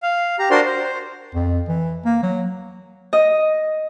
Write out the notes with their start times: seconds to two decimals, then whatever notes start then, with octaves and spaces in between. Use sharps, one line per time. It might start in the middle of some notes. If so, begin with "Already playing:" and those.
0.03 F5
0.39 G4 A#5
0.51 D4 F#4 A#4 C5 D5 C6
0.66 C5
0.84 C5
1.34 F2
1.68 E3
2.05 A#3
2.23 F#3
3.13 D#5